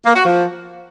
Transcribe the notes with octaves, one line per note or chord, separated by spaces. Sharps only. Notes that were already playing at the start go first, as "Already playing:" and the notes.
A#3
F#4
F3